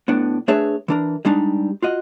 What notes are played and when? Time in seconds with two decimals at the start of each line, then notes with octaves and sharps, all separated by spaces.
0.08 A2 B3 D4
0.48 A3 D4 G#4 B4 C#5 E5
0.88 E3 D4 A#4
1.25 G3 G#3 D4 D#4
1.82 F4 F#4 D#5